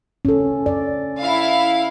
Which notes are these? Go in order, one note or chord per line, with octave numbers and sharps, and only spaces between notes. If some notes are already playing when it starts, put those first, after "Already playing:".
C#4 A4
D5
E4 F5